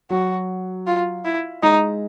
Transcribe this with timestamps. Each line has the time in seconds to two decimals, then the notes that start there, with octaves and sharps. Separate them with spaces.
0.10 F#3 F#4
0.87 F4
1.25 E4
1.63 G#3 D#4